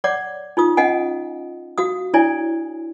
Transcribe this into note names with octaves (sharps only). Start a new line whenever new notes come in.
C#5 D5 F#5 D6
D#4 F4 D#6
C#4 D#5 F5 F#5 G#5
F#4 F5 D#6
D4 E4 C#5 D5 G#5